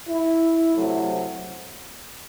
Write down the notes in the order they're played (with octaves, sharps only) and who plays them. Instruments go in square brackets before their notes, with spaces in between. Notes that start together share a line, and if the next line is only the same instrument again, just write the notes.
[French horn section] E4
C3 F#3 A3